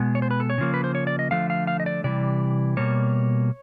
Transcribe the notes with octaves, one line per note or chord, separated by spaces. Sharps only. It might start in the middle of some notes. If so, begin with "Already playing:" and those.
Already playing: B2 G#3 B3
C#5
C5
B4
A4
C#5
C#3 F3 A#3
B4
C5
C#5
D5
D#5
D3 F3 A3 F5
F5
F5
D#5
D5
C3 E3 G3 D5
B2 G3 A#3 C#5